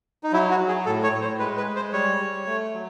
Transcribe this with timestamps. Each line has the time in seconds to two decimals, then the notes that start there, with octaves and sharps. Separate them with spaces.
0.23 D#4
0.32 F#3 E4
0.50 F#4
0.60 F#3
0.68 G#4
0.86 A2 A4
1.03 C#5
1.12 A2
1.21 C5
1.39 G#3 B4
1.57 B4
1.67 G#3
1.76 C5
1.92 G3 C#5
2.20 G3
2.46 A3
2.73 F#3